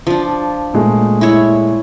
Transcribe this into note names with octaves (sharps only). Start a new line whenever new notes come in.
F3 D4
A#2 G#3 A3
E4 C#5